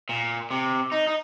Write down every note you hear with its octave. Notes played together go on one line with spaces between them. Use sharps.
A#2
C3
D#4
D#4